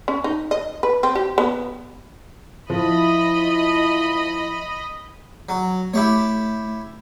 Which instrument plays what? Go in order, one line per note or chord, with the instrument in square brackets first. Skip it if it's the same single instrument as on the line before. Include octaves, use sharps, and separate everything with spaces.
[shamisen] C#4
D#4
D#5
B4
C4
G4
B3
[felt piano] F3 [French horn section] E4 [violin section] D#5 B5
[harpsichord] F#3
[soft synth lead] A3 [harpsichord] E4 G4 C#5